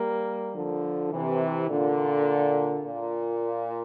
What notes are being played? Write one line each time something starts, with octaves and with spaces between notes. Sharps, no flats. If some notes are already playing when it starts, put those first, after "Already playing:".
Already playing: G3 A#3
D3 F3
C3 E3
A#2 D3
A#2